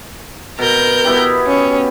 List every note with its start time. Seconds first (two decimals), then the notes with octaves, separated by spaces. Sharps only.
0.59 B2 A#4 G6
1.05 B3 E4 G4
1.47 C#4